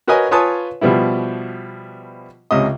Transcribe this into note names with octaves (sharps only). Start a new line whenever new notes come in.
F#4 A#4 B4 C#5 D#5 G#5
F4 B4 C#5 G#5 A5 D#6
B2 F3 G3 B3 E4
C#2 C3 C#4 D#5